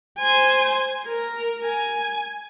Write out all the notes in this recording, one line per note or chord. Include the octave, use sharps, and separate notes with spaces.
C5 G#5
A#4
G#5